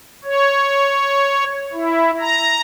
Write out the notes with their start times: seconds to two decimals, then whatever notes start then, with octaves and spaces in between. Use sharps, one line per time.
0.25 C#5
1.73 E4
2.20 A#5